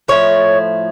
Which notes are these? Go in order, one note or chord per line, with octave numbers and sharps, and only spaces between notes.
A2 F3 A3 C#5